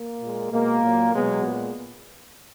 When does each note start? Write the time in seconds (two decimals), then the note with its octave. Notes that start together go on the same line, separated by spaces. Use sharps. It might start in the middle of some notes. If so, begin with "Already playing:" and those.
Already playing: A#3
0.22 A#2 G#3
0.52 B2 G#3 A#3
0.82 A#2 F#3
1.14 B2 F#3 G#3 B3
1.45 A#2 G#3